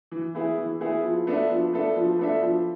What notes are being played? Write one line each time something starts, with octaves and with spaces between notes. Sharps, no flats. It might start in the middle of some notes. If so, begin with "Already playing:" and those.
E3
B3 E4 G#4
E3
B3 E4 G#4
F3
B3 D4 A4 E5
F3
B3 D4 A4 E5
F3
B3 D4 A4 E5
F3